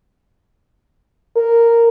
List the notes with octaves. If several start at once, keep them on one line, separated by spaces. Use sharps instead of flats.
A#4